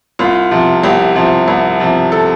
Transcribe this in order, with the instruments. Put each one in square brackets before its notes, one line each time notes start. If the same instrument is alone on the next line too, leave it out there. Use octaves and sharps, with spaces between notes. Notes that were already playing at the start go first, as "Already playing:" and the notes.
[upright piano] C2 F4
C3 F3
C2 G4
C3 F3
C2
C3 F3
A4